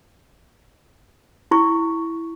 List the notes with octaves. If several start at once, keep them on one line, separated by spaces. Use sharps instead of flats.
E4 C#6